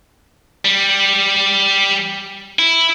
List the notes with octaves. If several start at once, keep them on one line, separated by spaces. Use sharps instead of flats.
G3
E4